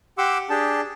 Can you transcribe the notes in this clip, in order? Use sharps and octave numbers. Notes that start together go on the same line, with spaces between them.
G4 F#5 C6 D6 E6
D4 G4 G#4 G5 A5